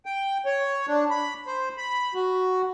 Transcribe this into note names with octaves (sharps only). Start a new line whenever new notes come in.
G5
C#5
D4
B5
C5
B5
F#4